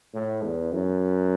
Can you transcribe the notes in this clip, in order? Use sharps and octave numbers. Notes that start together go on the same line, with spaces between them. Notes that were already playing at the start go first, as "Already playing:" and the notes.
A2
E2
F#2